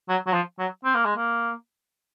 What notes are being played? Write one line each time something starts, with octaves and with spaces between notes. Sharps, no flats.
F#3
F#3
F3
F#3
C4
A#3
G#3
A#3